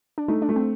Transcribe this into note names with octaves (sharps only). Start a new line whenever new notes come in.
D4
A3 D#4
D4
A3
C4